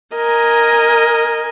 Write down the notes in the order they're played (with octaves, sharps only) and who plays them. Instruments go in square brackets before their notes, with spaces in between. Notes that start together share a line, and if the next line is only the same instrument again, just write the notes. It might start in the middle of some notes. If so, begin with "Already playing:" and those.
[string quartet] A#4 D#5 G#5